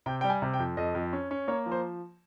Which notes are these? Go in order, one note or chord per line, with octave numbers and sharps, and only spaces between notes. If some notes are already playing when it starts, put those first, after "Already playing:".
C3 G5
G3 G5
G#5
C3
G5
F2
F2 D#5
F2
C#4
C#4
A#3 C#5
F3
C5